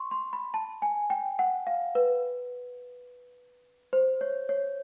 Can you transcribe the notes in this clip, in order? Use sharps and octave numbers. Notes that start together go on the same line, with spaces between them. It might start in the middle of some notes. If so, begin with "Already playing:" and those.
Already playing: C6 C#6
C6
B5
A5
G#5
G5
F#5
F5
B4
C5
C#5
C#5